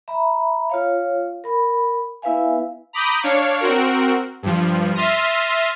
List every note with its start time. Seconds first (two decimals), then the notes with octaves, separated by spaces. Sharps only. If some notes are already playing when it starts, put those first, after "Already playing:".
0.08 E5 A#5 B5
0.70 F4 C#5 F5
1.44 A#4 B5
2.22 B3 E4 B4 E5 F5 G#5
2.93 A#5 B5 D6 D#6 G6
3.22 D4 C#5 F5 C#7
3.61 C4 F#4 A#4
4.43 G2 F3
4.95 E5 C6 F6 A6 A#6 D#7